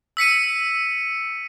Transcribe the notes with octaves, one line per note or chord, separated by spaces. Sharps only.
E6 B6 C#7 D#7